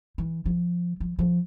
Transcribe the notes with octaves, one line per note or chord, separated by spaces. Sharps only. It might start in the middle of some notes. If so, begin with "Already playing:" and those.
E3
F3
F3
F3